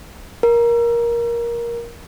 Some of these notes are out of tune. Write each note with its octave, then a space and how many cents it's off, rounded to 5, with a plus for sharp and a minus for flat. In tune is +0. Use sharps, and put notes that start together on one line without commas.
A#4 +15